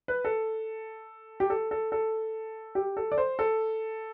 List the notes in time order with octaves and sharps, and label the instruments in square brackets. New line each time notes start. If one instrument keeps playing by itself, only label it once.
[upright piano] B4
A4
G4
A4
A4
A4
G4
A4
D5
C5
A4